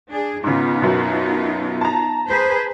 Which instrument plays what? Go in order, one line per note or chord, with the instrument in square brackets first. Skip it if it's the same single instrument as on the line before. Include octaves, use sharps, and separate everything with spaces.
[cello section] D4 G#4
[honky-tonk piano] G#2 C#3 [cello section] B3 D#4 F4
[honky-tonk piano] F#2 B2
A5 A#5
[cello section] G#4 B4 C5